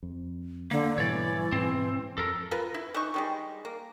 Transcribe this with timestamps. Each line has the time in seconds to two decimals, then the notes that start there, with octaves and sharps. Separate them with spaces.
0.03 F2
0.71 D3 A#3
0.98 G#2 B2 E3 G3 C#5 D5
1.52 G#2 B2 C4
2.18 F2 A4 A#4
2.51 F4 A#4 B4
2.74 E4
2.94 E3 D#4 C#6
3.14 D#3 G3 G#3
3.65 A#3